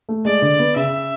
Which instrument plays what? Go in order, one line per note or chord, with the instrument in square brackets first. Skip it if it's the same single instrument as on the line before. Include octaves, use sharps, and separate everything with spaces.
[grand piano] A3
[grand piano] G#3 [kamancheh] D5
[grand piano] D3
B3
[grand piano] C#3 [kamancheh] E5